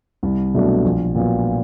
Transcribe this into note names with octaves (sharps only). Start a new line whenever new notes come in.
C2
B2 F#3 A3 D4
A#1
A#2 F#3 B3